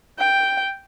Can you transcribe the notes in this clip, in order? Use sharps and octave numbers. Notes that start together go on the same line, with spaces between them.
G5